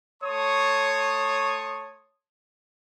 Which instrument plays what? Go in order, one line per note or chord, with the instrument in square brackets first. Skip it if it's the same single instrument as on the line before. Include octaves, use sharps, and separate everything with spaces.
[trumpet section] A3 C#5 A5 C6 C#6 D#6